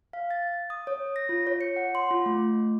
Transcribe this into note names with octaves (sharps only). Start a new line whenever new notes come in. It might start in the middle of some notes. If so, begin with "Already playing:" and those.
F5
A6
D#6
C#5
A#6
F4
C#5
C#7
F#5
C6
F4
A3